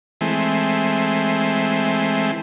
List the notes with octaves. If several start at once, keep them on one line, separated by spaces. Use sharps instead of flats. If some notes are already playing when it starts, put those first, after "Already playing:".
E3 G#3 A3 C4